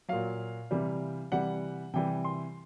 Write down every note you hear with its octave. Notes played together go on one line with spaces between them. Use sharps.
A#2 F#3 F5
C3 E3 G3
C3 E3 G3 F#5
C3 E3 G3 G5
C6